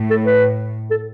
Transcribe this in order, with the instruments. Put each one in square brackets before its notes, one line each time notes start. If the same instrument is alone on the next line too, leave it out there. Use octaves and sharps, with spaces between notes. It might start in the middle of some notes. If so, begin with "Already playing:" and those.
Already playing: [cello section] A2
[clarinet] A4
B4
A4